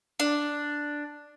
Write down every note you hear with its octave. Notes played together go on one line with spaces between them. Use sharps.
D4